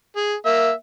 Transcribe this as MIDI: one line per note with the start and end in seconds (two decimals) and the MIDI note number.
0.17 0.34 68
0.45 0.71 58
0.45 0.71 76